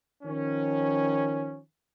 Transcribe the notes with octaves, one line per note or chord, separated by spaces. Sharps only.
D#3 F3 C#4